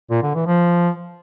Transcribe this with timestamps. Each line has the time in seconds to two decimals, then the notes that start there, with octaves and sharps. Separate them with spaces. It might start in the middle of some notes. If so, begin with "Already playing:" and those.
0.11 A#2
0.23 D3
0.35 E3
0.47 F3